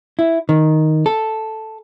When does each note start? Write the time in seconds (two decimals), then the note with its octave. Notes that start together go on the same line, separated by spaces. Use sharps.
0.19 E4
0.49 D#3
1.06 A4